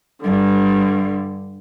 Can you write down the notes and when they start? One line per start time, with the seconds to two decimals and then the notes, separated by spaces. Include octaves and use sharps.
0.21 G2 D3